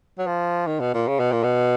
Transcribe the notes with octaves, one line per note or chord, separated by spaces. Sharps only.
F#3
F3
D#3
B2
A#2
C#3
B2
A#2
B2